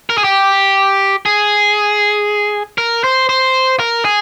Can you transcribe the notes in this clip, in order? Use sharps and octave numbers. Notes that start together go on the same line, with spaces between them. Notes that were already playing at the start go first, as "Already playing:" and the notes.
A#4
G#4
G4
G#4
A#4
C5
C5
A#4
G#4